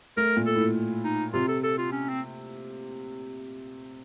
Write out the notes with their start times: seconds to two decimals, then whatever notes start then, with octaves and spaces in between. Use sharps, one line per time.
0.17 A3 A#4
0.36 A#2
0.46 A4
0.56 A2
1.04 D#4
1.33 C3 F4
1.48 A4
1.63 A4
1.78 F4
1.92 C#4
2.09 C4